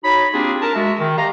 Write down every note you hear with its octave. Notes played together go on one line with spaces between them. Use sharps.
D#4 F#4 C#5 B5
A#3 C4 D4 F4 G4 G#4
A#4 A5
G#3 F#4 E5
D#3
G4 D#5 F5 A#5